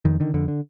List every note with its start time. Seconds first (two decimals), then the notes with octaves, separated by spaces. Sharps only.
0.05 F2 D#3
0.20 D3 D#3
0.34 F2 D3
0.48 D3